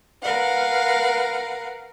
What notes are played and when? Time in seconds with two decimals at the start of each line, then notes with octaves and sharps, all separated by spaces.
0.22 A#4 B4 F5 F#5